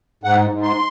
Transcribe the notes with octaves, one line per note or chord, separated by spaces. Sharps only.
G#2 F#5
G#2
C6